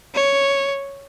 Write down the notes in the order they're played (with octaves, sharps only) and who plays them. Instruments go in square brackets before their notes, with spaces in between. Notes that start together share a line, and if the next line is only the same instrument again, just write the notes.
[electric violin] C#5